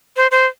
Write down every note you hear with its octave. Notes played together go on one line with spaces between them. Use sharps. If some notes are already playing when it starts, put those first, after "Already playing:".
C5
C5